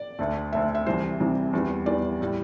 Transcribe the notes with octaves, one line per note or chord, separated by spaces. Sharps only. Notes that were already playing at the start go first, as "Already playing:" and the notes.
Already playing: D5
D2 D3 A3
D2 D3 A3 E5
E5
C2 C3 E3 G3 C5
C2 C3 E3 G3
E2 E3 G3
E2 E3 G3 D5
A2 G3